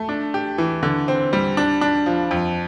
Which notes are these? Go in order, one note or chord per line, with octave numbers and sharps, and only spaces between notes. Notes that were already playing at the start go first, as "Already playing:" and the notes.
Already playing: A3
D4
G4
E3
D3
C4
G3
D4
D4
F3
F2